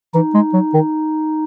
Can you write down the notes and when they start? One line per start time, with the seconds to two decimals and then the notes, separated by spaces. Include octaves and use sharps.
0.14 E3 D#4
0.34 G#3
0.54 F#3
0.74 D#3